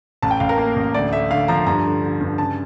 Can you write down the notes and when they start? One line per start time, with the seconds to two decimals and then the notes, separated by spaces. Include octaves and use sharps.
0.22 A1 A5
0.31 G5
0.40 A1 F5
0.49 A#4
0.58 A#3
0.76 A1
0.94 D2 D5
1.12 A3 E5
1.30 D3 F5
1.48 F3 A#5
1.66 G2 A#5
1.85 D3
2.03 D3
2.21 G2
2.38 C#3 A5